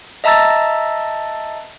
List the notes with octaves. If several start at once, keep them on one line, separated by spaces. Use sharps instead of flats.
D#5 E5 A5 A#5 E6 A6